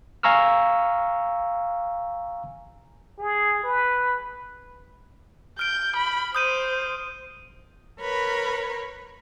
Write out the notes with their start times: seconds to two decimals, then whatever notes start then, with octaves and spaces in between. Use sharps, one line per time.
0.23 F5 G#5 A#5 C#6 E6 F6
3.18 G#4
3.63 B4
5.59 F6 G6 D7
5.97 B5
6.35 C5 D#6 G6 D#7
7.99 A#4 B4 C#5 B5